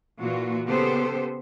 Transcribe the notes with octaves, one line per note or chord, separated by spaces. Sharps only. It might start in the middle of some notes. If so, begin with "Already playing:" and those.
A#2 E3 A#3 F4 F#4
C#3 B3 G4 A4 C5